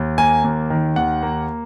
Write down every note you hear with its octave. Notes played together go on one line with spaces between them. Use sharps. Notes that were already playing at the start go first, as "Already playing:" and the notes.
Already playing: D#2
A#3 G#5
D#2
D#3
D#2 F#5
A#3